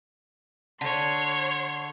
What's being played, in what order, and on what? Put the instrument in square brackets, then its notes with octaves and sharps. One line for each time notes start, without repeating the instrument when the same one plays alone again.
[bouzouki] D3 [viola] C#5 C6